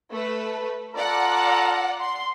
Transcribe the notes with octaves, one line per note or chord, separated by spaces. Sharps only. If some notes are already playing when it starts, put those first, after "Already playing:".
A3 B4
F4 A4 D5 F#5 A#5
C6